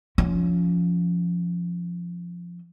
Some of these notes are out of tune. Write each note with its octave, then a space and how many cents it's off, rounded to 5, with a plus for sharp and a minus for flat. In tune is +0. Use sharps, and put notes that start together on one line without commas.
F3 +0 C#4 +25